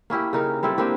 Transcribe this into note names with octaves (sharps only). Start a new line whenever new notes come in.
A#3 C#4 E4 G4
C#3 D#4 A#4
G3 C4 E4 A4
A#3 C4 D4 G4